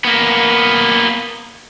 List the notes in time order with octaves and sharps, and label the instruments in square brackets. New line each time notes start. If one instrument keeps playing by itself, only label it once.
[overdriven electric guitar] A#3 B3